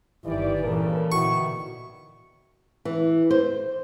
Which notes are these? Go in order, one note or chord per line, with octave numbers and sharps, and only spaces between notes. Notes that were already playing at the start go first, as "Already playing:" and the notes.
G1 D#3 E3 E4 G4 D5
G2 A#2 C#3 E3 A4 A#4
A#2 D3 D#3 B3 E4 F#4 C#6
E3
C5